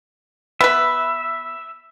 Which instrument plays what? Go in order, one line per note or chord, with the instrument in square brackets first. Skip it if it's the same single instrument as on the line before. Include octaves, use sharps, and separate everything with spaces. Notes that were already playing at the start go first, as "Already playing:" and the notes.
[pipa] B3 B4 [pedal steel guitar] E5